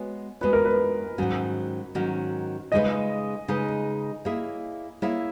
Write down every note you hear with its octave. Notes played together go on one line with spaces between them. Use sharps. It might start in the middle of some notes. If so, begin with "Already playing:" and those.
Already playing: G#3 B3 F#4 C#5
G#3 B3 F#4 B4 C#5
A#4
B4
G#2 D#3 F#3 C#4 F#4
G#2 D#3 F#3 C#4 F#4
C#3 G#3 D#4 G#4 B4 D#5
C#3 G#3 D#4 G#4 B4
A#3 E4 G#4 C#5 E5
A#3 E4 G#4 C#5 E5